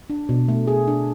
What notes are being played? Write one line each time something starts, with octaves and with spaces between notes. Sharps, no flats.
D4
B2
A3
G#4
D4